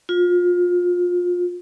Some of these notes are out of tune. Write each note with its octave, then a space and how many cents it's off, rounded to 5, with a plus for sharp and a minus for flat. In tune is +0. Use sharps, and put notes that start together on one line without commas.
F4 +25